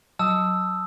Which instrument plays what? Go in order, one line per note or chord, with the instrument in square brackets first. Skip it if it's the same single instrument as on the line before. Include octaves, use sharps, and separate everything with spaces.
[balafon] F#3 [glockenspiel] A5 D#6 E6